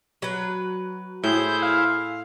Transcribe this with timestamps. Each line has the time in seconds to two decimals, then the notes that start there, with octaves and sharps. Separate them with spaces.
0.22 F#3 B4
1.24 A2 E4 G#4 C5 G6
1.62 F5